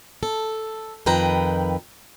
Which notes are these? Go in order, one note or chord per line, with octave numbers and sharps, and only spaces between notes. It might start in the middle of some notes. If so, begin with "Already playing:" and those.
A4
F2 D#3 B4 G5 A#5